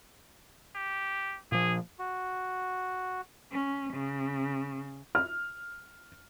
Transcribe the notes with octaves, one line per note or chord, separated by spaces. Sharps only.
G4
A#2 F3 G#4
F#4
C#4
C#3
F6